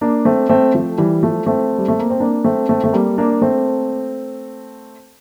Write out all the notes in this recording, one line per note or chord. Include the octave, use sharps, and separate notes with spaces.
A#3 D4
A3 C4
A3 C4
F3 A3
E3 G3
F3 A3
A3 C4
G3
A3
A#3
C4
A#3 D4
A3 C4
A3 C4
A3
G3 A#3
A#3 D4
A3 C4